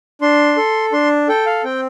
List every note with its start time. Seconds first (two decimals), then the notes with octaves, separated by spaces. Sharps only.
0.21 D4 C6
0.57 A4
0.92 D4 C6
1.28 A4 G5
1.46 F5
1.64 C4 G5